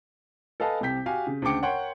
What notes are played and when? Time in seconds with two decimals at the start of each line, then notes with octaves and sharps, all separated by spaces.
0.60 A4 B4 D#5 F5 G#5 A5
0.81 C2 C3 G4 G6 B6
1.06 F#4 G4 F5 G#5
1.27 C#3
1.42 D2 C#3 G#3 G5 D6 C#7
1.62 A#4 C#5 F#5 G5 C6